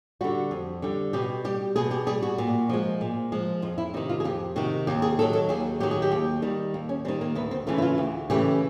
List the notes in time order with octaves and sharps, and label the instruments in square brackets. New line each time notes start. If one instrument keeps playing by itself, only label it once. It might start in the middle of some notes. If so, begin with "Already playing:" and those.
[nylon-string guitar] D3 G3 F#4
F2
D3 G3
B2 G4
G3 G4
B2 G#4
G4
G3 G#4
F#4
A#2
F3 G#3
A#2
F3 G#3
F2 F4
E4
C3 D#3 D#4
F4
G#4
F2 G4
C3 D#3 F#4
D#2 G4
G#4
D#3 A4
F#3
A4
D#2 G#4
D#3 F#3 G4
G#4
G4
D#2
D#3 G3
D#2
C#4
G3 C4
D#3
A#3
D2 B3
C4
C#3 E3 A3 F4
E4
F4
D2
C#3 E3 A3 G4